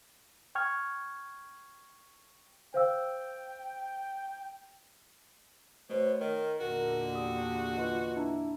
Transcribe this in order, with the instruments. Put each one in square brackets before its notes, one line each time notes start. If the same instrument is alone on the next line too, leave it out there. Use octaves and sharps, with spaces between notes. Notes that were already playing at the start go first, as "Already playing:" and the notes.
[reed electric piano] G5 C#6 F6 G#6
[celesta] C5 F5 E6 [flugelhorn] G5
[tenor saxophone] B2 [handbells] A3 C#5 [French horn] C5
[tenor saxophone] D#3 [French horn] A#4 [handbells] D#5
[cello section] E2 A#2 D3 [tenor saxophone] F#4 [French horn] A#4
[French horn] G4 [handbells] D#6
[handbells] F4 B4 D#5
[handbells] D4 A5 A#5 [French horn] E4